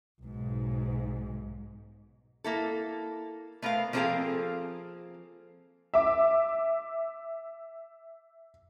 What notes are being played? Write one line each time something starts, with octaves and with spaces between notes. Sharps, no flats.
B1 G#2
A#3 E4 A4
A3 B3 A#4 C5 F5
F3 A#3 C4 G#4 A4 F5
E5 D6